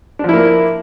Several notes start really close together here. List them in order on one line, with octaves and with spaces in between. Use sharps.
D4 F3 E4 A#3